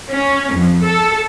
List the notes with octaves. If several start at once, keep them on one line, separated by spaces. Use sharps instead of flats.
C#4
F2
A4